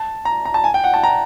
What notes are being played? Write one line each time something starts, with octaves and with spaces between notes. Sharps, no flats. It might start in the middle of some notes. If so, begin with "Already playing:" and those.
Already playing: A5
A#5
A#5
A5
G#5
G5
F#5
A5
A#5